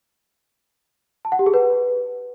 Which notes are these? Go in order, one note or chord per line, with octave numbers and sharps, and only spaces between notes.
A5
F#5
G4
G#4
B4